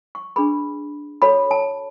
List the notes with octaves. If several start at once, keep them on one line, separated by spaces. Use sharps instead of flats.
C#6
D4 G#4 B4 B5
F#4 A4 C#5 B5
A5